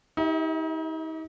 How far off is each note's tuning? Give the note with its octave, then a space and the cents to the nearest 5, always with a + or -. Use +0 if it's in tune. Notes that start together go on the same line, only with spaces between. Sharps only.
D#4 +40 G4 +0 E5 -25